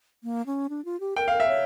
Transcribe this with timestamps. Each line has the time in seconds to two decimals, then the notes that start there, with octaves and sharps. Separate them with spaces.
0.24 A#3
0.46 C#4
0.69 D4
0.85 F4
1.00 G4
1.16 A#4 G5
1.28 A#4 F5
1.40 E5
1.48 C#5